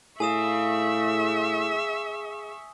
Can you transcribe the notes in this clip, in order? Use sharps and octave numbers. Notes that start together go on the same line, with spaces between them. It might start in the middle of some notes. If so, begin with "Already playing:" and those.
A2 G#4 E5 F5 G#5 C#6 D#6 E7